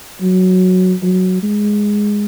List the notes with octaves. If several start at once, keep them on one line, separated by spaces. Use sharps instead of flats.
F#3
F#3
G#3